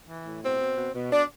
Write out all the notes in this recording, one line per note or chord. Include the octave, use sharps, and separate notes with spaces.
E3
A2
B2 C4
B2
B2
B2
B2 D4